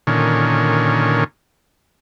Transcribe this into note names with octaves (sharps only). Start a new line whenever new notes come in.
A#2 D3 D#3 C#4